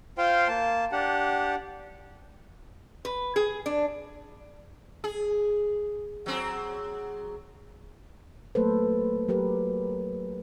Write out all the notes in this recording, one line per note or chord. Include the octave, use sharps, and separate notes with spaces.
F4 C5 F5 G5 C6
A#3 A5
D4 G4 F#5
B4
G#4
D4
G#4
F#3 C4 G#4
F#3 A3 A#3 A4 B4 C5
F#3 G4 A#4 B4